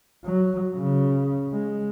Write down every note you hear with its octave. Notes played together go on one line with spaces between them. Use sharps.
F#3
C#3
G#3